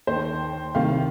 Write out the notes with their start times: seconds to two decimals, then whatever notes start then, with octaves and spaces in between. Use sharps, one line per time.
0.07 D#2 D#3 C5
0.75 C2 C3 D#3 F5